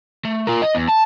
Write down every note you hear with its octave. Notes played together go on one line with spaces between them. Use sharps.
A3
F4 A#4
D#5
E2
A5